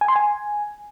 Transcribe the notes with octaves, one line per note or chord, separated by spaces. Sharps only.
G#5
C6
G#5